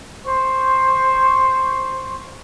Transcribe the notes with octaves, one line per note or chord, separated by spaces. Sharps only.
C5 C#6